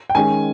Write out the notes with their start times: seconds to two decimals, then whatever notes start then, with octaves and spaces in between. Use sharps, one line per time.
0.10 G5
0.15 D#3 G#3 C#4 G#5